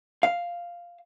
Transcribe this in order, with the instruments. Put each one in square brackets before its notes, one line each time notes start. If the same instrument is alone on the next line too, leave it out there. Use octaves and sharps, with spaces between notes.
[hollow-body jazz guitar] F5